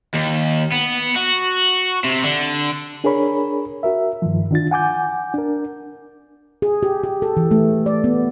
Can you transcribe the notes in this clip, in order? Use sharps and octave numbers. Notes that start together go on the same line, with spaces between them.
D#2
B3
F#4
C3
D3
D4 G#4 A#4 C#5 B5
F#4 A#4 E5
G2 D#3 F3
D#3 D4 F4 A6
F#5 G#5 D6 G6
D4 A#4
G#4
G4
G4
A4
E3
A3
D5
B3